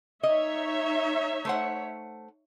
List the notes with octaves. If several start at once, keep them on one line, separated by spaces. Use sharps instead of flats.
D#4 C#5 D#5 E5
A3 C5 F#5